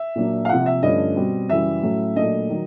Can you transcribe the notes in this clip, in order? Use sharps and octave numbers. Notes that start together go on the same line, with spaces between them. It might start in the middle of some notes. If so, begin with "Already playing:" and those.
Already playing: E5
A#2 F#3 A#3 D4
F5
C3 F3 A#3 F#5
E5
G2 D3 F3 A3 C#4 D#5
B2 G3 C4
F#2 C#3 E3 G3 E5
A2 F#3 A3 C#4
A#2 F#3 A3 D4 D#5
D#3 F#3